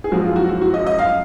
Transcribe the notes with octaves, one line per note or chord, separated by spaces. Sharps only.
G#4
F#2 F3 G#3 F#4
F4
F#4
F#4
F#4
D#5
D#5
F5